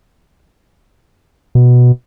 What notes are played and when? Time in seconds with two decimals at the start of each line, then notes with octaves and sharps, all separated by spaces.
1.55 B2